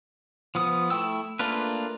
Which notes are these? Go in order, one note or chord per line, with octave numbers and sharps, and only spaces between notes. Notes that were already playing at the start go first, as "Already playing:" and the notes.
F3 B3 D#6
A3 E4 G5 E6
A3 A#3 D4 F4 B4